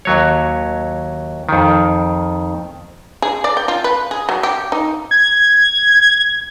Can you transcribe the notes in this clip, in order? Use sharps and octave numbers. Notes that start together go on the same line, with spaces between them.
D#2 F#3 C#5
F2 D#3
G#4
D5
G5
F4
B4
G#4
F#3
G4
D#4
G#6